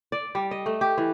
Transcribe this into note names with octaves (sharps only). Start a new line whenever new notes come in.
D5
G3
D#5
A3
G4
E3